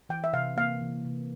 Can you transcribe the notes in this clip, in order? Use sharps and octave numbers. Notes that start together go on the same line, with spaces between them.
E3 G5
E5
C3 F5
A#3 F5
E3
C3